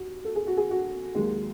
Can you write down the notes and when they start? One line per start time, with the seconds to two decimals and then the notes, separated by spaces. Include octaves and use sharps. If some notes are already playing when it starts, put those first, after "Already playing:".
Already playing: D#2 F#4
0.25 A4
0.35 G#4
0.47 F#4
0.57 G#4
0.71 F#4
1.15 D#2 D#3 F#3 G#3